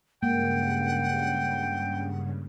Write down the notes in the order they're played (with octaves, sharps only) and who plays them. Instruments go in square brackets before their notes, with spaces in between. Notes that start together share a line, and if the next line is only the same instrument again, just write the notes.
[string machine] G2 C#3 [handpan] G#3 A#3 [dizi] F#5 [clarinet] G5